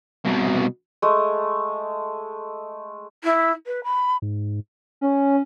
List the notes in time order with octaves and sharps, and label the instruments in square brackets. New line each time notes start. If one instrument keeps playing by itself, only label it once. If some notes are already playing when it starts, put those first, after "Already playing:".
[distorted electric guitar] C2 B2
[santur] G#3 A3
[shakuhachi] E4
B4
B5
[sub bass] G#2
[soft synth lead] C#4